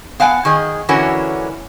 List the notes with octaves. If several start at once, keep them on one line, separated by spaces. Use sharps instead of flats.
B3 F5 F#5 G#5
D#3 G#4 D#5
D3 E3 C#4 E4 F#4 A#4